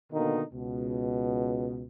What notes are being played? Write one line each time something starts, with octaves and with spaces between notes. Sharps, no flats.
B2 D3 D#3 A#3 D#4
C#2 B2